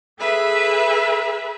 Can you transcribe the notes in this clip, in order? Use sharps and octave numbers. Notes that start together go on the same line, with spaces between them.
G#4 A4 B4 E5